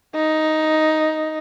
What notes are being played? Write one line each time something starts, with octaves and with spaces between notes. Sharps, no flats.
D#4